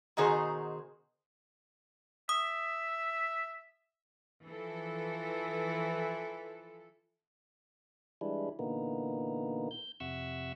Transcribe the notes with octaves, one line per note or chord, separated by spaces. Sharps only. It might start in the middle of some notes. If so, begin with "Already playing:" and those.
B2 D#3 D#4 F#4 G#4 C5
E5 D#6
E3 F3 A4
E3 G3 G#3 D4 E4
A#2 D3 E3 A#3 B3 D#4
G6
F2 C3 E5 F#5 C#6 E6